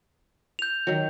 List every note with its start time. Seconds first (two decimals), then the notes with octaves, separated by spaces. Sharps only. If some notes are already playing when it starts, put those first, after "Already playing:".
0.59 G6 F7
0.87 D#3 F#3